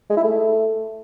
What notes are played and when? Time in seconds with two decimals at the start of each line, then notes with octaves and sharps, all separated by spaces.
0.10 G#3
0.17 E4
0.24 A3